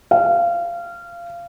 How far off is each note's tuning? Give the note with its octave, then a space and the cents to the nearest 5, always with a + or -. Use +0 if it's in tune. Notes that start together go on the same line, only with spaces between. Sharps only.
F5 -20